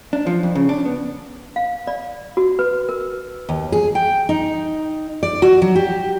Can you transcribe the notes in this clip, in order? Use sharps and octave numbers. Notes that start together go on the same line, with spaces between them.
D4
F3
F2
C#3
D4
B3
F5
D5
F#4
B4
A#4
D#2
G#4
G5
D#4
D5
F#4
F#3
G4